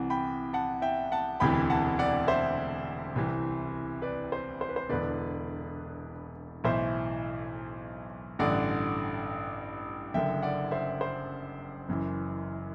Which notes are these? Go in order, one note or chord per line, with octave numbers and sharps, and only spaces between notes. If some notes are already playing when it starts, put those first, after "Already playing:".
Already playing: C2 C3 E3 F#5
G5 B5
F#5 A5
E5 G5
F#5 A5
E1 D2 C3 E3 G5 B5
F#5 A5
D5 F#5
C5 E5
C2 C3 E3
B4 D5
C5
C5
B4
C5
E1 E2 D3 B4 D5
B1 A2 E3 C5 E5
A1 G2 D3 D5 F#5
F#1 F#2 D3 E5 G5
D5 F#5
C5 E5
C5
F#1 F#2 E3